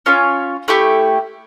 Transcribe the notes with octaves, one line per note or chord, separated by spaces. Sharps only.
C#4 F4 C#5
A3 E4 G4